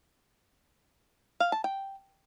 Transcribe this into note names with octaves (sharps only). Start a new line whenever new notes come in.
F5
A5
G5